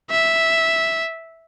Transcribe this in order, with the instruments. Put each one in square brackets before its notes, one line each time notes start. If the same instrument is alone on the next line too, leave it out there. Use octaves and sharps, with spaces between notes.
[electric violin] E5